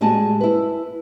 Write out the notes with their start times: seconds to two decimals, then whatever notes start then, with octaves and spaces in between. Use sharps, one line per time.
0.01 A2 G3 G#3 F#4 G#5 A5
0.40 E4 B4